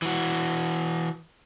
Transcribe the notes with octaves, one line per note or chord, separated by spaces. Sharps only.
E3 F#4